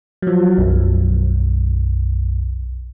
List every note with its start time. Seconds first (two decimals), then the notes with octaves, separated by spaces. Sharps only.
0.22 F3 F#3
0.58 B1 F#2